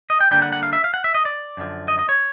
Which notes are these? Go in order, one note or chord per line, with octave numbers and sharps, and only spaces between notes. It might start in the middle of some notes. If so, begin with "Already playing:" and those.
D#5
G5
D3 G3 A#3 D4 G5
F#5
F#5
F5
E5
F5
F#5
E5
D#5
D5
F#2 D3 F3
D#5
D#5
C#5